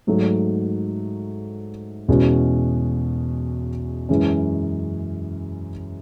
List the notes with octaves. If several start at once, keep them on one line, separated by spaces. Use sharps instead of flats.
G#2 F#3 A3
E2 B2 G#3 C#4 F#4
F#2 E3 G#3 C#4